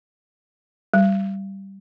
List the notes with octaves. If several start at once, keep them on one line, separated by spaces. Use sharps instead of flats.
G3